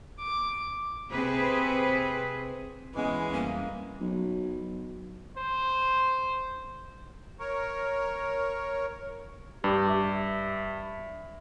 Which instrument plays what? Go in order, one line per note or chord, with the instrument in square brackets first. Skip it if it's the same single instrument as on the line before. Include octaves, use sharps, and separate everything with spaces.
[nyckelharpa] D6
[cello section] C3 C4 G#4 B4
[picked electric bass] D1 B3 [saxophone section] E3 G#3 [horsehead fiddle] C#4
[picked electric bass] G1 F2 G3 [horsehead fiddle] A#3 [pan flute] C#4
[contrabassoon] B1 [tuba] F#3
[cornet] C5
[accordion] A#4 C#5
[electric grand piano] G2 [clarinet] G4
[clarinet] E5